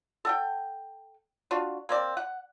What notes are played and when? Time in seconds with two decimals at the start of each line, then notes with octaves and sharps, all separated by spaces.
0.25 A4 F#5 G5
1.51 D4 F4 F#4
1.89 A#3 C4 D5
2.17 F#5